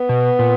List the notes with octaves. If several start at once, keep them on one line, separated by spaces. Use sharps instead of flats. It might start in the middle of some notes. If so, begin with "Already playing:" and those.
Already playing: B3
B2
A#2